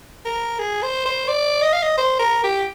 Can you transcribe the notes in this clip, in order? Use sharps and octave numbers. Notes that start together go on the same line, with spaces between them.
A#4
G#4
C5
C5
D5
D#5
F5
D#5
C5
A#4
G4